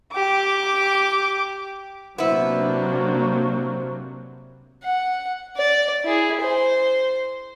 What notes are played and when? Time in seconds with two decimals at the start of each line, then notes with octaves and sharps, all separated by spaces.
0.13 G4 D6
2.18 C3 F#3 A#3 B3 D4 E4 C5
4.83 F#5
5.57 D5
6.04 E4 G#4
6.41 C5